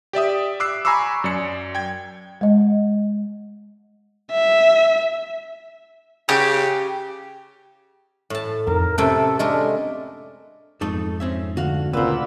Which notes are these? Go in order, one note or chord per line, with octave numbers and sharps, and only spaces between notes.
G4 D5 E5 D#6
D6 E6 F#6 C7
G#5 A#5 B5 C#6 D6 E6
F#2 D5 C#7
G5 G#6
G#3 D#5
E5
C#3 G4
A2 A5
F2 D#4 A#4
C3 A3 C#4 A4 G5
G#3 A3 D4 A#4
F2 G#2 A3 D#4 A4
C4 C#4 E5
D3 A3 F#4 F5
D2 A#2 C#3 C4 B4 F#5 B5 E6